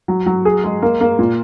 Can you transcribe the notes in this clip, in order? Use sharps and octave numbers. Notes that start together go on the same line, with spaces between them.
F#3
F#3
G#4
G#3
A#3
A#3
A#2